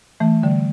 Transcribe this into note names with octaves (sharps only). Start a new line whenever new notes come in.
E3 A3
D3 G3